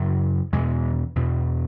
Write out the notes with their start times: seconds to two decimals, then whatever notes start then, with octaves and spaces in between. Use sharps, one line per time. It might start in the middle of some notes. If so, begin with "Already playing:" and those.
Already playing: F#2 C#3
0.52 E2 B2 E3 G#3
1.15 E2 B2